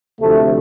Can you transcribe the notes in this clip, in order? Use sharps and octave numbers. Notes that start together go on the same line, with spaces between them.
D2 C3 F3 A3